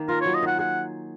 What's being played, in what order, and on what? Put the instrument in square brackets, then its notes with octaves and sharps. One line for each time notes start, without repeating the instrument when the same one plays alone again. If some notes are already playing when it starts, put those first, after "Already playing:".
Already playing: [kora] D#3 A#3
[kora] F4 [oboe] A#4
[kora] F#3 [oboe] C#5
[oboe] D#5
[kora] D#3 [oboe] F#5
[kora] G#4 [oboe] F#5